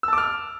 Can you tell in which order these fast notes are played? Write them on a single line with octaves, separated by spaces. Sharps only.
E6 A5 D6 F6